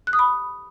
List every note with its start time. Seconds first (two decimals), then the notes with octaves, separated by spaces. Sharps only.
0.07 F#6
0.13 D#6
0.19 B5